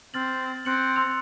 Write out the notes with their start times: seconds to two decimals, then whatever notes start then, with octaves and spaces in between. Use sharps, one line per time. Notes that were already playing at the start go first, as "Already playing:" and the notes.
0.14 C4 F6 A6 F#7
0.65 C4 F#6 C#7 F#7
0.96 C6 E6 F7